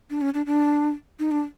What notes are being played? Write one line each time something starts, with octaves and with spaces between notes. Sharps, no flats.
D4
C#4
D4
D4
D#4
D4